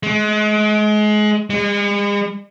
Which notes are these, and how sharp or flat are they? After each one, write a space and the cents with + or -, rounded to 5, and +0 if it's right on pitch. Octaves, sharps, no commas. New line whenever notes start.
G#3 +30
G#3 -40